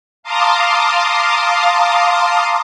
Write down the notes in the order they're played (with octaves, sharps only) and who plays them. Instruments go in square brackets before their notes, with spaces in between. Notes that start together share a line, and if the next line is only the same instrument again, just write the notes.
[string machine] F5 A5 A#5 C6 D6 D#6